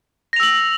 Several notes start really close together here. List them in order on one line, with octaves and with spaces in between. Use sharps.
A#6 F7 E6 F#7